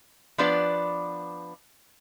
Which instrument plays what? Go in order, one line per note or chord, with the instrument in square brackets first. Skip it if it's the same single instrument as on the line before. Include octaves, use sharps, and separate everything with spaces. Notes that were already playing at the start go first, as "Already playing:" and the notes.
[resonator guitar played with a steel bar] F3 B3 D4 B4 D5